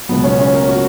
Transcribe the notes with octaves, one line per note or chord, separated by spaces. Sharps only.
C#2 B2 F#3 B3
C#4
C#4
A#4
F#4